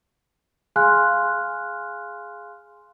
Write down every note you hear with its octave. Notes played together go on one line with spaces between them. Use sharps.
G#4 F5 G#5 C6 F6 F#6